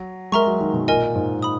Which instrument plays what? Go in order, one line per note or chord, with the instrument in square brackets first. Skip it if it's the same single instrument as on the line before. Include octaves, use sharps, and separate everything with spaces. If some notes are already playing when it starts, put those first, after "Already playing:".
Already playing: [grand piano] F#3
[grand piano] G#3 [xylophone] A#4 E5 A#5 C#6
[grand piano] F#3
D#3
B2
[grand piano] A#2 [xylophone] A#4 D#5 G#5
[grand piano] G#2
[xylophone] B5 D#6